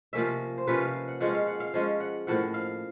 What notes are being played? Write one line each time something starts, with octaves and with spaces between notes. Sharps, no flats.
C3 F3 A#3 C#4 E5
C5
C3 F3 A#3 C#4 B4
F5
F#5
F3 G#3 C#4 F#5
F5
F#5
F5
F3 G#3 C#4
F#5
A2 F3 A#3 F#5
F5